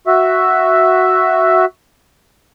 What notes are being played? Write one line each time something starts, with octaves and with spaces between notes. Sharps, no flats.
F#4 E5